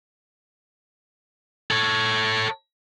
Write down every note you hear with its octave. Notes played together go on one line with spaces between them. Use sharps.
A4 C#5